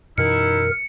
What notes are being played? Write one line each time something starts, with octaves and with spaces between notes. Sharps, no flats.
F#2 B2 E3 D#4 E4 A#4 C#7